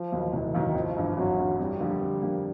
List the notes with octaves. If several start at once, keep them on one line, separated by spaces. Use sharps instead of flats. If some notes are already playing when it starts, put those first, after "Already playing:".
Already playing: F3
D#2 D#3 F#3
F1 E3
D#2 D#3 F#3
G#1 F3
G2 E3
G#1 F#3
G2 E3
F2 G3
D3 F3 A#3
F2
D3 F3 A#3